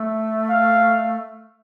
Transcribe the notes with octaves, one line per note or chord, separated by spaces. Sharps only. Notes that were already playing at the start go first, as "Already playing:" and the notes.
Already playing: A3
F5